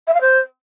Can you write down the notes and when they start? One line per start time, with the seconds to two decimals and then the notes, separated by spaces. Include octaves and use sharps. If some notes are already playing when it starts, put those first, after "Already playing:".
0.07 E5
0.14 F5
0.21 C5